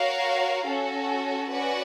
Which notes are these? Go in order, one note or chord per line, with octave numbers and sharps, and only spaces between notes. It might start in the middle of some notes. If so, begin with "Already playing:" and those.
Already playing: F#4 A#4 C#5 F5
C#4 F#4 A4
C#4 F#4 B4 D5 F#5